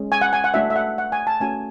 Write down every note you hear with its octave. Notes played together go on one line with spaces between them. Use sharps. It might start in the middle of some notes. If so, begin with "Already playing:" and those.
Already playing: G#3 C#4
G#5
F#5
G#5
F#5
A3 D4 F#4 E5
E5
F#5
F#5
G#5
A5
A3 C#4 F#4 G#5